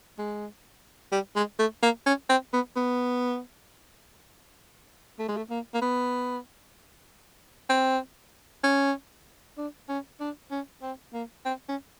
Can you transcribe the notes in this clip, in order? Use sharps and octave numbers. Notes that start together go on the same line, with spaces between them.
G#3
G3
G#3
A3
A#3
C#4
C4
B3
B3
A3
G#3
A3
A#3
A#3
B3
C4
C#4
D4
C#4
D4
C#4
C4
A#3
C4
C#4